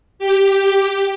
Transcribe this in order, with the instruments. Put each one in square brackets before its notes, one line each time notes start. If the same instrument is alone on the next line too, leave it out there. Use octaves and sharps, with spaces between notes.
[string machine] G4